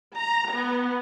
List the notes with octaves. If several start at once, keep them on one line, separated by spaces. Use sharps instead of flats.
A#5
B3